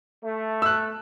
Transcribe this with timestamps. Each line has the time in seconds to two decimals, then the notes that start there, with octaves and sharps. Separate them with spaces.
0.24 A3
0.62 E6 F#6